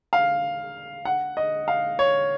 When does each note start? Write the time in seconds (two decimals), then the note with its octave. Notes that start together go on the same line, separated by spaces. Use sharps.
0.13 F5
1.05 F#5
1.37 D#5
1.68 F5
1.99 C#5